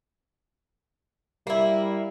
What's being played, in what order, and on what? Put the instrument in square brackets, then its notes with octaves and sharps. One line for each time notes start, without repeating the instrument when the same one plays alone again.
[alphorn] G3 [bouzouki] A#3 E4